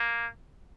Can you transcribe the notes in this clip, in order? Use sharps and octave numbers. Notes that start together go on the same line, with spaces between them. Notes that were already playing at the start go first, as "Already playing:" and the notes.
Already playing: A#3